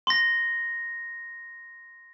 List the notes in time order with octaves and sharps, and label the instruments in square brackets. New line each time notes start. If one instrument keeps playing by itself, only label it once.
[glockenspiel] C6 A#6